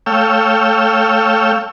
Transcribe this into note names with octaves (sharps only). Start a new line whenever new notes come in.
A3 C#5 F5 G5 E6